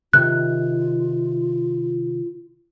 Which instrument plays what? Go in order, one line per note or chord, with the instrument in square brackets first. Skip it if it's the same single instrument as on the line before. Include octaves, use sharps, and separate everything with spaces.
[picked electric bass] C3 D#3 [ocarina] F4 [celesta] F#6